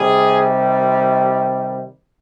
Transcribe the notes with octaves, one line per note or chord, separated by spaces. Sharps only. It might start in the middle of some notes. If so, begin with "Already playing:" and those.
Already playing: C3 D#3 G3 G#4